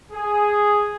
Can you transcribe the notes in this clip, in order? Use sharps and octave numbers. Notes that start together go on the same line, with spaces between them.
G#4